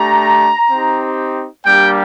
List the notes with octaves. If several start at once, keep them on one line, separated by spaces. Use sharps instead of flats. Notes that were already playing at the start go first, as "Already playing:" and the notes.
Already playing: A3 D4 G4 A#5
C4 D#4 G4
G3 A#3 D4 G4 G5